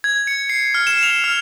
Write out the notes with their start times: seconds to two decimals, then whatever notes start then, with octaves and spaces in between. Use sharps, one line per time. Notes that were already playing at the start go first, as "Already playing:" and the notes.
0.04 G#6
0.27 C#7
0.49 C7
0.74 F6
0.87 E7
1.03 F7
1.24 F6